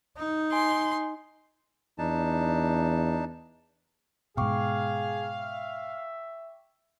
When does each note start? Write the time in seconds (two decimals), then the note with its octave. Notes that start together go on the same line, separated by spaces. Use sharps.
0.18 D#4
0.53 G#5 C6
1.98 E2 D4 D#4 A5
4.37 G#2 B2 G#4 F5 G5 C#6 D6
5.39 E5